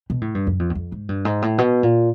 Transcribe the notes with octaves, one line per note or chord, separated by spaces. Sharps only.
B2
A2
G2
F#2
F2
E2
F2
G#2
G2
G#2
A2
B2
A#2